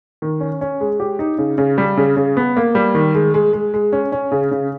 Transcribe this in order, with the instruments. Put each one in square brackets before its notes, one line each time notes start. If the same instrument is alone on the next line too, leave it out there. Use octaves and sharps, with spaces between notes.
[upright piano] D#3
C#4
C#4
G#3
G4
D#4
C#3
C#3
G3
C#3
C#3
B3
A#3
G3
D#3
G#3
G#3
G#3
G#3
C#4
C#4
C#3
C#3